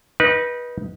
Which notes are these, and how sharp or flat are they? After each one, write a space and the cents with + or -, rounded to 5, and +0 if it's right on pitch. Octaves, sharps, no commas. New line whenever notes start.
D#4 +5 B4 -25